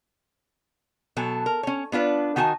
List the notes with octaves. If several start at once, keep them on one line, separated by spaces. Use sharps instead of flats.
B2 F#3 A4 G#5
A#4
C#4 C#5
B3 D4 F4 B4
D#3 D#4 F#4 G#5 A5